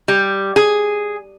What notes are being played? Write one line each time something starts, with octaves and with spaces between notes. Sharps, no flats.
G3
G#4